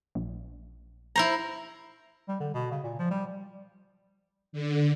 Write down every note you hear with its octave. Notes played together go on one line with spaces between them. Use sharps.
A#1
E4 C5 A#5
G3
D3
B2
C#3
A#2
F3
G3
D3